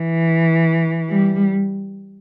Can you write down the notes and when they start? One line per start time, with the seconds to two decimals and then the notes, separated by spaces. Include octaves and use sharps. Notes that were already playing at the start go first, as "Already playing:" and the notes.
Already playing: E3
1.11 G3